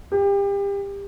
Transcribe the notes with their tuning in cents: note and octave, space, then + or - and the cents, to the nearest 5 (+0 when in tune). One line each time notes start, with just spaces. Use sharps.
G4 +30